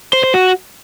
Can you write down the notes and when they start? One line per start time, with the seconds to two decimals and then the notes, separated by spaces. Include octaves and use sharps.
0.13 C5
0.24 C5
0.34 F#4